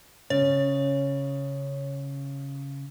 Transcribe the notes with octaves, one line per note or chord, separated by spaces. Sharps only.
C#3 C#5